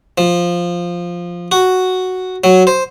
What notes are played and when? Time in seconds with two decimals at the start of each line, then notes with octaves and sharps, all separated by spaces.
0.18 F3
1.52 F#4
2.44 F#3
2.67 C5